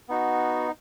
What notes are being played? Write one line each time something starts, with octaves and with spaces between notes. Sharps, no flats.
B3 D#4 F#4